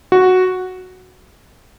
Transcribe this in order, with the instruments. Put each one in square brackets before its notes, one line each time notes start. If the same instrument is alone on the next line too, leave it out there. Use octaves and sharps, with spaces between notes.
[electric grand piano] F#4